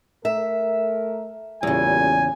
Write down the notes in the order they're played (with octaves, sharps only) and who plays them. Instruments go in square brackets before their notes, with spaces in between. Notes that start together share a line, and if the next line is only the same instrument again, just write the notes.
[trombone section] A3 A#4 [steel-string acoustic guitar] E5
[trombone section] A1 A#2 G3 [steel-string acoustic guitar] E2 C#3 [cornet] G#5